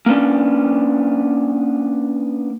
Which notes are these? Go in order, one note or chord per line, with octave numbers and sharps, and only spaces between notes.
A#3 B3 C#4 D4